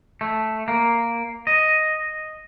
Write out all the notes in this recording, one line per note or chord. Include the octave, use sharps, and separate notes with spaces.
A3
A#3
D#5